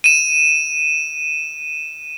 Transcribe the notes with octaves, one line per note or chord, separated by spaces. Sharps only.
D#7 E7